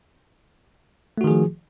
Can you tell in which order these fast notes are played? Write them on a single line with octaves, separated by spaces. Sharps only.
A3 F#4 D#3 G#4 F3